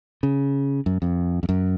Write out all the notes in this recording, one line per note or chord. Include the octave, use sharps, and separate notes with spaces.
C#3
F#2
F2
F2
F#2